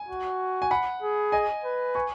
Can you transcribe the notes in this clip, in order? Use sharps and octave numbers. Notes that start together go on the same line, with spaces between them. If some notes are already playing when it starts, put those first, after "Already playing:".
Already playing: G#5
F#4
G#5
F#5 B5
G#4
D#5 G#5
B4
G#5 C#6